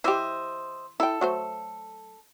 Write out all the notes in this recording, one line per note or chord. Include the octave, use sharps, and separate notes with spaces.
E3 G4 C5 D#5 E5
E4 A4 G5
F#3 A3 C5